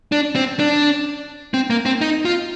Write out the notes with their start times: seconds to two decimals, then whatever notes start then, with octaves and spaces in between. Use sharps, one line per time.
0.12 D4
0.36 C4
0.59 D4
1.54 C4
1.70 A#3
1.86 C4
2.01 D#4
2.25 F4